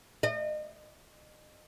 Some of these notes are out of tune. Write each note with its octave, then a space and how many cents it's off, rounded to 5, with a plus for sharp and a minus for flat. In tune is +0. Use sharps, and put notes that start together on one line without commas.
D#5 -35